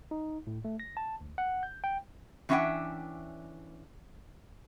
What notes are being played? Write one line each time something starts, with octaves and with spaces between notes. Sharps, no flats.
D#4
A2
A3
A#6
A5
D2
F#5
G6
G5
E3 C#4 D4 E5 F#5 G5